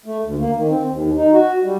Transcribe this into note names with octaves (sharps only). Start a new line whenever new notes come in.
A3
D2
A#3
D#3
C4
D#2
D#4
F#4
G3